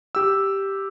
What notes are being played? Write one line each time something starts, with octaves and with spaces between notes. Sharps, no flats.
G4 E6